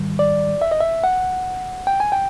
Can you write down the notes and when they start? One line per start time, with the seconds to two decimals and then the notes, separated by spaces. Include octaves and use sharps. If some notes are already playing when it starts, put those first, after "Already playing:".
Already playing: G#2 D#3 G3
0.19 D5
0.62 E5
0.71 D#5
0.80 E5
1.04 F#5
1.87 G5
2.00 G#5
2.12 G5